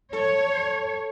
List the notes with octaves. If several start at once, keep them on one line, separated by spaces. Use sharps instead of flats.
A4 C#5